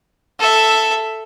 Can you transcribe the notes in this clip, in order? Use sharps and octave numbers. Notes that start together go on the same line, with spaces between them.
A4 E5